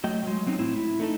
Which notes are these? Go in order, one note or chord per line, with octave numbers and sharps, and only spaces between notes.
F#3 A3 D#5 G5
F#3 G#3
F#3 C4 C#4 D#4
A2 C4 E4
E4
A3 D#4 A4